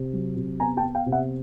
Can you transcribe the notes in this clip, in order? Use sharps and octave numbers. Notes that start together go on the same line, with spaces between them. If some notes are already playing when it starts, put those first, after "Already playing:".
Already playing: C3
F#3
C3
B3 G#5 A#5
G5 A5
B3
F5 G5
C3
E5 F#5